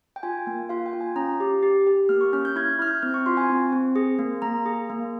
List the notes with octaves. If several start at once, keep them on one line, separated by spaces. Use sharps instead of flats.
G5
F4 G#5
A#3
F4 F5
G5
F4
G#5
C#4 A#5
G4
G4
G4
A#3 F6
C#6
C#4 F6
G6
E4 G#6
E4 F6
G6
C4 F6
C#6
F4 C6
G#5
C4
C4
G#4
A#3
A#3 A#5
G#4
A#3